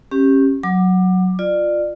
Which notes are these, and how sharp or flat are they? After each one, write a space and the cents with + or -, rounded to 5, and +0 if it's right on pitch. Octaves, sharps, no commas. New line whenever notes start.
C#4 -25 G4 +0
F#3 +0 D6 +25
F4 +0 D5 +25